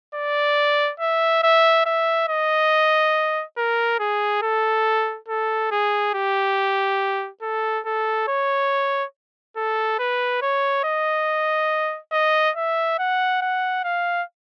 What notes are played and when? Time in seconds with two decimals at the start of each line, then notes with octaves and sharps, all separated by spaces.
0.15 D5
1.00 E5
1.43 E5
1.86 E5
2.29 D#5
3.57 A#4
4.00 G#4
4.42 A4
5.29 A4
5.72 G#4
6.15 G4
7.42 A4
7.86 A4
8.28 C#5
9.57 A4
9.99 B4
10.42 C#5
10.84 D#5
12.13 D#5
12.56 E5
12.99 F#5
13.42 F#5
13.84 F5